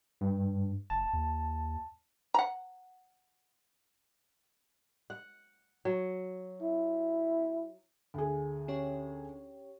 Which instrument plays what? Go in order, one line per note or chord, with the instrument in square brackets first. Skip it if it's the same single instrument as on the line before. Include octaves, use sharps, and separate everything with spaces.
[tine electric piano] G2
[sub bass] F#1 [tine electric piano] A5
[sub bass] D#2
[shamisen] F#5 A#5
[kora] F#5
F#3
[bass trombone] E4
[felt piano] D2 G#4
[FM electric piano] C#4 G4 C#5